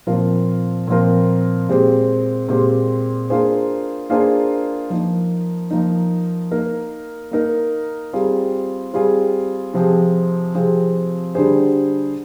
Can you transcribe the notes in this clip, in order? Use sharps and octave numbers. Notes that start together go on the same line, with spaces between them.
A#2 F3 C4 F4 A#4
A#2 F3 C4 F4 A#4
A#2 G#3 C4 G4 C5
A#2 G#3 C4 G4 C5
A#3 D4 F4 G#4 C5
A#3 D4 F4 G#4 C5
F3 A#3 D#4
F3 A#3 D#4
A#3 D#4 A#4
A#3 D#4 A#4
G3 C4 F4 G#4
G3 C4 F4 G#4
C3 F3 C4 F4 G#4
C3 F3 C4 F4 G#4
D3 G3 D4 G#4 C5